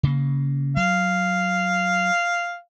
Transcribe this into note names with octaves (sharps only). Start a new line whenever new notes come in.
C#3 A#3
F#3 F5